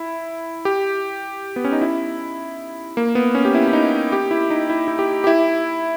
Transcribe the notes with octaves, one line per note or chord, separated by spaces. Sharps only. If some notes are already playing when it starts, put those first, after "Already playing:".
Already playing: E4
G4
B3
C#4
D#4
E4
A#3
B3
C#4
G4
E4
E4
D#4
G4
E4
D#4
E4
E4
G4
G4
E4